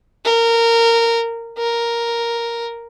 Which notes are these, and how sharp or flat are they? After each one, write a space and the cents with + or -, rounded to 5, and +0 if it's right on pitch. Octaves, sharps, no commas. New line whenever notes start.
A#4 -15
A#4 +0